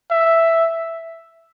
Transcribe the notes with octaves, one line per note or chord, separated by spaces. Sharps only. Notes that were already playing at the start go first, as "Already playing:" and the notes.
E5